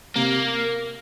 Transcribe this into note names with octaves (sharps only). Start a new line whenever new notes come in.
C3 A#3